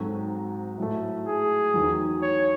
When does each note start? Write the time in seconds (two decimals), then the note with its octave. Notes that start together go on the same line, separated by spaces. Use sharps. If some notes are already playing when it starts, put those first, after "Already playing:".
Already playing: G#2 F#3 C4 F#4 A4
0.78 A2 F#3 A3
1.26 G#4
1.74 E2 D#3 F#3
2.23 C#5